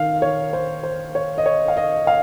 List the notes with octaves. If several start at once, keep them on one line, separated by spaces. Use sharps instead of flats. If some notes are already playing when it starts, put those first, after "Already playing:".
Already playing: D#3 F5
C#5
C5
C5
C#5
D#5
C#5
F5
D#5
F5